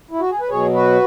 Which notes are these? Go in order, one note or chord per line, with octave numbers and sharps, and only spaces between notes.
E4
F#4
G#4
B4
B2 F#3 G#4 C#5
F#4 B4